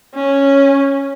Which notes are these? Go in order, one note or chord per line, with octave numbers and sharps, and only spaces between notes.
C#4